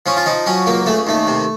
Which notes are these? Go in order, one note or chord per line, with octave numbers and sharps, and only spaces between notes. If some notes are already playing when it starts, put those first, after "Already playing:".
F3 C#4
F4
F3 D#4
F#3 C#4
C#2 A#3
C#3 A3
D#2 A3
C3